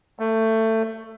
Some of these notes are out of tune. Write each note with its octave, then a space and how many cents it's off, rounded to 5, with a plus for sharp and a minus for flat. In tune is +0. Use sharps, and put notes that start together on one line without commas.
A3 +20